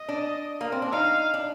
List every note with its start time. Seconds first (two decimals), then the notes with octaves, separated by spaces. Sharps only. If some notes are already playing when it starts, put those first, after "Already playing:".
Already playing: D#5
0.09 D4
0.61 A#3
0.72 C4
0.82 D4
0.92 D#4 F5
1.34 D4